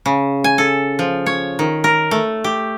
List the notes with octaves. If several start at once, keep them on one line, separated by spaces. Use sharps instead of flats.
C#3
G#5
A4
F3
C#5
D#3
A#4
A3
G4